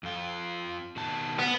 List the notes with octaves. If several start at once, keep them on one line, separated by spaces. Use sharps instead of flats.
F2 F4
B2 D#3 A5
B3